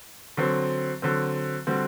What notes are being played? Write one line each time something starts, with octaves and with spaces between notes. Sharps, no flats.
D3 F#3 C4
D3 F#3 C4
D3 G3 C4 F#4